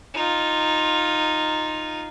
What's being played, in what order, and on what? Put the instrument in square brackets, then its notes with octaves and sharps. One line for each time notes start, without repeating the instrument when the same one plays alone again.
[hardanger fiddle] D#4 F4